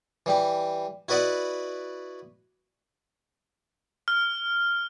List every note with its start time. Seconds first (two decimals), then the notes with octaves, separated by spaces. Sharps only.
0.26 E3 G3 G4
1.09 E4 F#4 B4 D5 D#5 F#5
4.08 F6